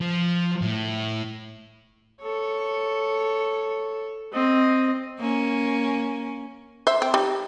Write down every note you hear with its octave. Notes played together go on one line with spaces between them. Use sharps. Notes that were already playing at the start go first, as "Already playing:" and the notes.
F3
A2
A4 C#5
C4 D#5
A#3 C#4
C5 E5
C4
G3 D#4